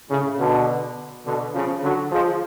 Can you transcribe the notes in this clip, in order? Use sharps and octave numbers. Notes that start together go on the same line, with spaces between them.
A2 C#3
B2 D3
B2 D3
C#3 F3
D3 F#3
F3 G#3